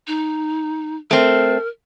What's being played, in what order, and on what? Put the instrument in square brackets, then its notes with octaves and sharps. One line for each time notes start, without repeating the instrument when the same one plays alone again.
[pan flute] D#4
[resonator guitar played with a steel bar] A3 C4 [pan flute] A#4